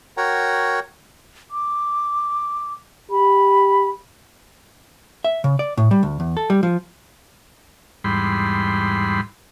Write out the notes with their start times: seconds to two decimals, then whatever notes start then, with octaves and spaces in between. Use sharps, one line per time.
0.17 F#4 A#4 C#5 F#5 G5 A#5
1.51 D6
3.11 G4 B5
5.24 E5
5.44 C#3
5.59 D5
5.77 A2
5.91 G3
6.03 D2
6.20 E2
6.37 A4
6.50 G3
6.63 F3
8.04 E2 G#2 G3 B5 C6